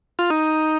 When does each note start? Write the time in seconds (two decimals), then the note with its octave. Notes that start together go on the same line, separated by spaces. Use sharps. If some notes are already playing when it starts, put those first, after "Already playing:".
0.19 F4
0.30 D#4